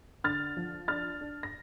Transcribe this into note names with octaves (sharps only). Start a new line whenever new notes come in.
D3 F6 A6
F3
D4 F6 A6
D4
A#6